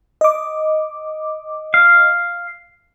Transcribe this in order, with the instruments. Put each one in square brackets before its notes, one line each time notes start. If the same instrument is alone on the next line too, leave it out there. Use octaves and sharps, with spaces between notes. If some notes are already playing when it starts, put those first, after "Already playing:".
[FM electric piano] D#5 D6
[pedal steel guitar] F5